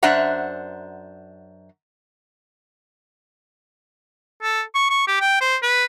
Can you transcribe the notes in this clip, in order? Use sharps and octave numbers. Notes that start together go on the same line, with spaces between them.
F#2 D4 C5 E5 F#5 A#5
A4
C#6
C#6
G4
G5
C5
B4